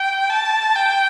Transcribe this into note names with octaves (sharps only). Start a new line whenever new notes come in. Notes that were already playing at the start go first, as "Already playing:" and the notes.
Already playing: G5
A5
G5